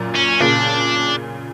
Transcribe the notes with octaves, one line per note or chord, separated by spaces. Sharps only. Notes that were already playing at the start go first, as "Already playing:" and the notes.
Already playing: F#2 A#2
C#4
A#2 C#3 D4